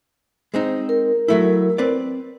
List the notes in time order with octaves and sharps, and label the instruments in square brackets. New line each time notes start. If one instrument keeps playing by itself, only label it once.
[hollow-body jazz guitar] G#3 C4 D#4
[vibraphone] A#4
[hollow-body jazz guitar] F#3 A3 E4
C4 B4 D5